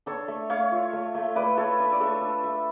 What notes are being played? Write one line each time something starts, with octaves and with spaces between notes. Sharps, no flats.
D4 A4 C#5
A3
A3 C#5 F5
F4
A3
A3
A3 B4 D5
A3 A4 C#5
D4
D5
A3 A4 C#5
D4
A3